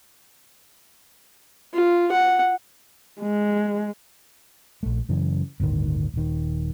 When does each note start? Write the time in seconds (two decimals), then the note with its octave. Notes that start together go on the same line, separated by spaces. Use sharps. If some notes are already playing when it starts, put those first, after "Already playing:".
1.74 F4
2.11 F#5
3.21 G#3
4.83 A#1 A3
5.09 F#2 C#3 E3
5.60 G1 D2 A2 D#3
6.14 D#1 D#3